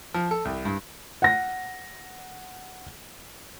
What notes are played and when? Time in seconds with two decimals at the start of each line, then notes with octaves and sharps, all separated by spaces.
0.14 F3
0.31 A4
0.45 C2
0.65 G2
1.22 F#5 A#6